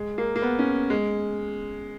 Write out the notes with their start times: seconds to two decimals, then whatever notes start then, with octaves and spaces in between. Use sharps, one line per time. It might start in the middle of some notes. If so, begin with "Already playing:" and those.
Already playing: G#3
0.18 A#3
0.36 A#3
0.42 B3
0.59 C#4
0.90 G#3